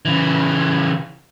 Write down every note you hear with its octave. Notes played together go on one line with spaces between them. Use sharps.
C#3 E3